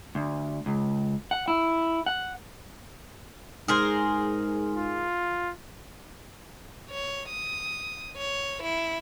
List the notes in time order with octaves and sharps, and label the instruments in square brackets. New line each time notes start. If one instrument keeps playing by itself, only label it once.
[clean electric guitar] D2
C#2
F#5
E4
F#5
[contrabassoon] G#2 [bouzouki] G#4 A#4 C5
[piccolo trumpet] F4
[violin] C#5
D#6
C#5
E4